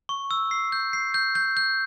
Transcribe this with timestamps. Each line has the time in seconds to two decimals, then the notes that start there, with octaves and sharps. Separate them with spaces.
0.09 C#6
0.31 E6
0.51 C7
0.72 G6
0.93 C7
1.14 G6
1.35 G6
1.57 G6